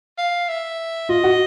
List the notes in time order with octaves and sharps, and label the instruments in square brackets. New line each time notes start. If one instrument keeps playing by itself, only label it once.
[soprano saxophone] F5
E5
[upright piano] F4 [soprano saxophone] D#5
[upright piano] F#4